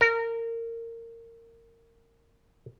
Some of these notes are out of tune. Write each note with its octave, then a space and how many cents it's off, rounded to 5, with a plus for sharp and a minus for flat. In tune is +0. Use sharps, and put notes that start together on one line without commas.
A#4 -20